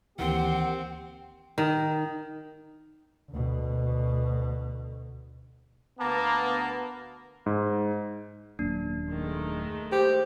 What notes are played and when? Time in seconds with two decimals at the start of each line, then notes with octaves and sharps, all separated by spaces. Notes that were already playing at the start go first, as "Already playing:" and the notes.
0.19 D2 D#3 E3 A#3 C4 G4 F#5
1.58 D#3
3.30 D2 B2
6.00 D2 A#3 B3 A5 A#5
7.46 G#2
8.59 D#1 F#2 A#3 D4
9.10 D#3 G#3 A3
9.92 G4 C5